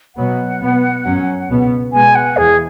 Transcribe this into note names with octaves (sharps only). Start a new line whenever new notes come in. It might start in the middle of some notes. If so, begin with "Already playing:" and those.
B2 F#3 B3 F#5
B2 B3
F#2 F#3 C#4
C#2 B2 B3
B2 G#3 B3 G#5
F#5
E2 E3 G#4